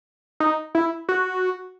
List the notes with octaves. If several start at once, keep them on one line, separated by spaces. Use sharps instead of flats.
D#4
E4
F#4